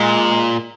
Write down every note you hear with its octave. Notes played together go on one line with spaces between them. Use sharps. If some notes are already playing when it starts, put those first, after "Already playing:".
Already playing: A#2 G#3